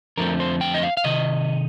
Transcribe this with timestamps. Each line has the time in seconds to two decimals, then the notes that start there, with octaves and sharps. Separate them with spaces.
0.17 F2 D3 F3 A3 C4 A#4
0.40 C5
0.61 G5
0.74 D#5
0.83 F5
0.97 F5
1.04 C3 D#3 D#5